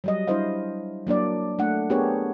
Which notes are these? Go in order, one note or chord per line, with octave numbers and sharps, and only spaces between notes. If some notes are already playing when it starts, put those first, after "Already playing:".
F#3 G3 D#5
G3 D4 E4 C5 D#5 F5
F#3 A#3 D4 D5
A3 D4 F#5
B3 D4 G4 G#4 A#4 C#5